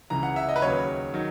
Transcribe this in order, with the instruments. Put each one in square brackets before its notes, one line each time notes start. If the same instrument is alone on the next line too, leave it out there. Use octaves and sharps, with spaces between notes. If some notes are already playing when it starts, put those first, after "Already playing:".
[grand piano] C#2 C#3 E3 A#5
F#5
E5
D#5
B4
D#2 C#3 F#3 C#5
D#3 F#3